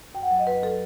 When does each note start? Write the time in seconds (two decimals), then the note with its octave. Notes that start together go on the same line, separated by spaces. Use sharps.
0.14 F#2 G5
0.23 F#5
0.31 F#3
0.39 D#5
0.47 F#2 B4
0.63 F#3 A4